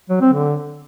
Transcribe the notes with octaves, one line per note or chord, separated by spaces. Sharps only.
F#3
C4
D3